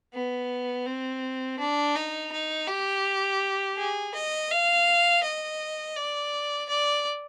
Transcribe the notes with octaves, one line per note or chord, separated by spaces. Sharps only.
B3
C4
D4
D#4
D#4
G4
G#4
D#5
F5
D#5
D5
D5